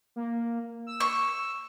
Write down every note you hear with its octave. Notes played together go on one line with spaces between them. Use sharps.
A#3
E6
C#6